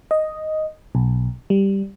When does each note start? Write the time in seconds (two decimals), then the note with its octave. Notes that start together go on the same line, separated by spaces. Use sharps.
0.11 D#5
0.95 B1
1.50 G3